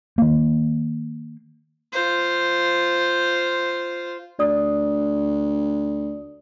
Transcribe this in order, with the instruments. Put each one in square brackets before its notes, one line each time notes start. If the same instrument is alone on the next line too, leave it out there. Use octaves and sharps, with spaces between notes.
[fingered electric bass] D#3 A#3
[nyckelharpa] F4 C5
[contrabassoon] D2 [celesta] D5 D#6